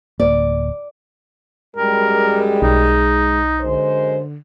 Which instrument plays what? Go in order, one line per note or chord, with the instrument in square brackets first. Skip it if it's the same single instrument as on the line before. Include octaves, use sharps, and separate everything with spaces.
[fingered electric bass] D1 A#3 [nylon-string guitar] D5
[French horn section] F#2 G3 [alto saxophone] G#3 [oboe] A#4
[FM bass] B1 [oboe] D#4
[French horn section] F#2 G#3 C5 [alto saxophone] D3